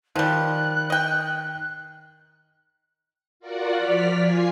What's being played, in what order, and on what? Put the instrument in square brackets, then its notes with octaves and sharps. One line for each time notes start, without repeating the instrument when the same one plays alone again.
[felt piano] D#3 [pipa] F3 G3 [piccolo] F#6
[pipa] D#5 G5
[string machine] F4 F#4 A#4 D5 F#5
F3 D5 F6 B6
F4 G#5 C7